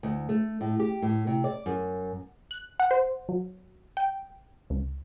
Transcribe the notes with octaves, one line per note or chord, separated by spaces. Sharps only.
D2
A3
A2
G4
A2
C3
D5
F#2
F#6
F#5
C5
F#3
G5
C#2